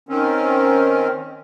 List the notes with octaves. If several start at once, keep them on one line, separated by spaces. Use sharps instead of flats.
D#3 C4 C#4